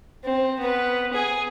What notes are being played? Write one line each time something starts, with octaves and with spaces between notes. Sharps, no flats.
C4
B3 B4
G#4 G#5